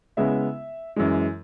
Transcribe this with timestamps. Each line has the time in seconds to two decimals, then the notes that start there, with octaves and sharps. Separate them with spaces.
0.17 C#3 G#3 B3 E4 E5
0.96 F#2 E3 G#3